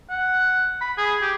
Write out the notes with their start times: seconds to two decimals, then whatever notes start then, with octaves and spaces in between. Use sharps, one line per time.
0.10 F#5
0.81 B5
0.98 G#4
1.22 G4